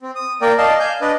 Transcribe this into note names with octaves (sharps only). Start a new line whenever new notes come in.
C4
D#6
A#3 A#4 D5 G5
D5 D#5 F5 A5
F5 G#5 G6
D4 B4 D5 D#5